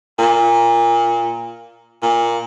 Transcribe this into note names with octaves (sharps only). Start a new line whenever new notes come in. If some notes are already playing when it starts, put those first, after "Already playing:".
A#2
A#2